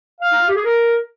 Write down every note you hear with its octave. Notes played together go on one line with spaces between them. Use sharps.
F5
D#4
F4
G4
G#4
A#4